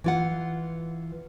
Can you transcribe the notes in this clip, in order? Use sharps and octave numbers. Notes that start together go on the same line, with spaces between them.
E3 F4 F#5